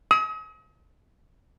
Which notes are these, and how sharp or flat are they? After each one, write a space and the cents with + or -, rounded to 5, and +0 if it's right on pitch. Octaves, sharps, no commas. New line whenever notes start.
D#6 +40